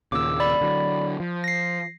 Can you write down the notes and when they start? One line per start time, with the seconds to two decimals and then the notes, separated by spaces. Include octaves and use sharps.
0.12 D#2 A#2 C#3 D6 E6
0.40 D5 B5
0.61 D3 F#3
1.20 F3
1.44 A#6 C7